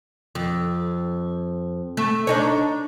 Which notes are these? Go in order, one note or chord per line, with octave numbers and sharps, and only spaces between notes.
F2
A3
D4 D#4 C#5